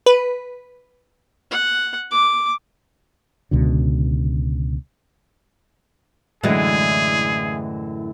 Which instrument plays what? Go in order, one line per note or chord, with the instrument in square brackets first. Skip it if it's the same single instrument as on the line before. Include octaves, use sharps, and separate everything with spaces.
[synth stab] B4
[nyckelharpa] F#5
D6
[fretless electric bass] C#2 B2 D3
[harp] F#2 A2 D3 [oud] E3 G#3 [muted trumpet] G#4